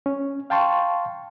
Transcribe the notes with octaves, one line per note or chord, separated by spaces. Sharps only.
C#4
F5 G5 A5 C6 C#6